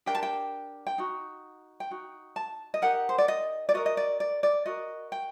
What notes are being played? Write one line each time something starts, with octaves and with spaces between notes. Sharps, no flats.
D4 G4 A#4 G5
A5
G5
G5
D#4 F#4
G5
D#4 F#4
A5
D#5
D#4 G4 A#4 F#5
C5
D5
D#5
D5
F#4 A#4 D#5
D#5
D5
D5
D5
F#4 A#4 D#5
G5